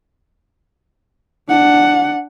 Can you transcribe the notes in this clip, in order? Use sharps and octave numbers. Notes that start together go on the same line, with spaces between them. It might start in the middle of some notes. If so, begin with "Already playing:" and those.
D4 F#5